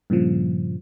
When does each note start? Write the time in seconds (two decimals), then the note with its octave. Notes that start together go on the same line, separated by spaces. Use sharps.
0.10 G2 A#2 C#3 F3